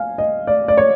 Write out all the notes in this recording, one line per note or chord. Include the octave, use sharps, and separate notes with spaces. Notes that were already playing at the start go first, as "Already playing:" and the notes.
Already playing: F5 G#5
D#5
D5
D5
C#5